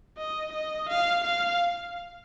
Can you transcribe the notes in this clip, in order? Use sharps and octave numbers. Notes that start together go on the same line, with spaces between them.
D#5
D#5
F5
F5